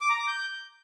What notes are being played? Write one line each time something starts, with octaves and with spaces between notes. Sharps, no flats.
D6
A#5
D6
G6